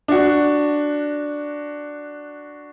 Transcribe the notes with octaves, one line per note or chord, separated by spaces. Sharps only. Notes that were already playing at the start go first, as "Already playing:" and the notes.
D4 F#4